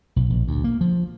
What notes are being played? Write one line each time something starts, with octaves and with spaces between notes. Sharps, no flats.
B1
A#1
D2
A#3
F3